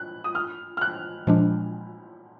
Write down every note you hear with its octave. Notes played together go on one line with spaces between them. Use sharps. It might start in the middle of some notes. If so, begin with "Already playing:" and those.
Already playing: F#6
D#6
F6
F6
F#6
A#2 F3 G#3 D4